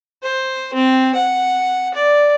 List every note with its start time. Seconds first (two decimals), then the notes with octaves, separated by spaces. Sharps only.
0.23 C5
0.74 C4
1.15 F#5
1.94 D5